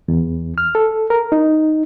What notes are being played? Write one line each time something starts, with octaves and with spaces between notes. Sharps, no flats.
E2
F6
A4
A#4
D#4